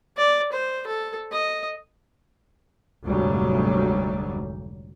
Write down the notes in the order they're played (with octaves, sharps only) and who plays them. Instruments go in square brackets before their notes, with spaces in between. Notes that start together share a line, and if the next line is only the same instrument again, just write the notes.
[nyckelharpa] D5
C5
A4
D#5
[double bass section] F1 D2 G#2 F#3 G3